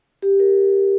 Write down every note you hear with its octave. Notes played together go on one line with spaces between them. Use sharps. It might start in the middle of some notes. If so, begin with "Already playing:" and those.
G4
A#4